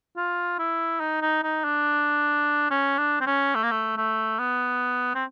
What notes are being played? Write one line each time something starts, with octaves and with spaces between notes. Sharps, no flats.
F4
E4
D#4
D#4
D#4
D4
C#4
D4
C4
C#4
A3
A#3
A3
A3
B3
C4